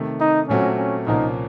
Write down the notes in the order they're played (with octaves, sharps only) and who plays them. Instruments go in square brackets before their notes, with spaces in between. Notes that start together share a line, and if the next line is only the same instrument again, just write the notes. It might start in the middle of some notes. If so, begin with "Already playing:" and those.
Already playing: [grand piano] C3 D#3 A3
[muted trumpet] D#4
[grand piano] A#2 F#3 A3 C4 F#4 [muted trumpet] C#4
[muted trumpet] C#4
[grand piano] C2 A#2 F3 A#3 C#4 [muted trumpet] D#4